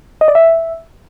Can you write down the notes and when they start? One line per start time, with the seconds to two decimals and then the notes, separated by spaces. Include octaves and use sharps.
0.21 D#5
0.28 D5
0.35 E5